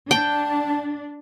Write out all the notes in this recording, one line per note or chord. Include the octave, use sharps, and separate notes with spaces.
D4 G5 A5